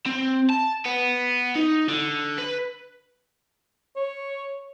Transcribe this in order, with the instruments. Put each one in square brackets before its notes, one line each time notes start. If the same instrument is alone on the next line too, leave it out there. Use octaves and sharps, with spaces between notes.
[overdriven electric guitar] C4
A5
B3
D#4
D3
B4
[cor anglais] C#5